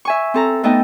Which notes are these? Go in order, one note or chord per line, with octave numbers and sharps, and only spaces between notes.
E5 G#5 C#6
C4 A4 A#5
A3 B3 D#4 A4 D#5 G5